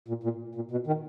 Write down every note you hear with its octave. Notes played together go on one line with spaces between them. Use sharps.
A#2
A#2
A#2
B2
D#3